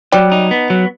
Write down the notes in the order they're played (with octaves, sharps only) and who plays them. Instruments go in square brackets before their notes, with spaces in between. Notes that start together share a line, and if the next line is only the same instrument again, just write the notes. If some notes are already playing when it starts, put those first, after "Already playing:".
[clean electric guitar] F#3 [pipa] G3
[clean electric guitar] D#4
B3
F#3